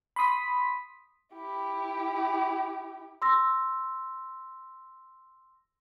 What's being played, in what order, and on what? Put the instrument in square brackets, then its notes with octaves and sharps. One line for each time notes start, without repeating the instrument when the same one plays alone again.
[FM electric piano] B5 C6 D#6 B6
[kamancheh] E4 G4
[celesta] C6 E6 A#6